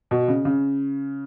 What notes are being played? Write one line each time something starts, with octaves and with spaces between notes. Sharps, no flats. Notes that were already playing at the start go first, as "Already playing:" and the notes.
B2
C#3
C#3